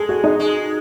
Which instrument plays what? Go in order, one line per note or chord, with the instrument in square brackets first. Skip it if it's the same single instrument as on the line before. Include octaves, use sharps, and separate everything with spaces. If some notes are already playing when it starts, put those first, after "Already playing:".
Already playing: [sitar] G#3 [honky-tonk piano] G#4 A4
[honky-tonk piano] F#4
D#4
[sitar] G#3